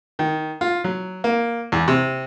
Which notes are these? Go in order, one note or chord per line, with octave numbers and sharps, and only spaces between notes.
D#3
F4
F#3
A#3
E2
C3